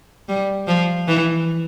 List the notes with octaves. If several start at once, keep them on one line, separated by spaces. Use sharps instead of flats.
G3
F3
E3